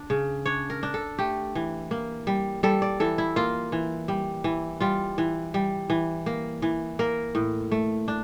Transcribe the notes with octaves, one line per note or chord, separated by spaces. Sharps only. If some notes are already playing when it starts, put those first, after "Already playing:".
Already playing: D4
C#3
D4 C#5
A#4
D4
A4
A3 G4
E3
A#3
G3
G3 A4
D5
E3 A4
E4
A#3 F4
E3
G3
E3
G3 F4
E3
G3
E3
A#3
E3
A#3 A#4
A2
A3
D4